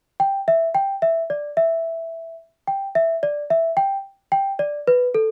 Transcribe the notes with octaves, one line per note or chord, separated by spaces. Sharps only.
G5
E5
G5
E5
D5
E5
G5
E5
D5
E5
G5
G5
D5
B4
A4